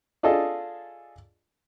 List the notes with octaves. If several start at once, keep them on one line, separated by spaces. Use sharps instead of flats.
D4 F4 G#4 A4 D#5